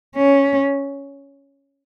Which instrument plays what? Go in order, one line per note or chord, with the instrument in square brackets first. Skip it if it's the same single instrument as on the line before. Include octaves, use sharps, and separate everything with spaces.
[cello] C#4